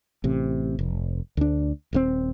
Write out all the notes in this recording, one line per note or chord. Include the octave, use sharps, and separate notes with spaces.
A1 C3
F1
D2 D4
D#1 G2 C4